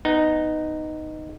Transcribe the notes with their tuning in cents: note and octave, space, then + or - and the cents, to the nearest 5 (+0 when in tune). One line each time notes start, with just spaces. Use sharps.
B3 +15 D#4 -5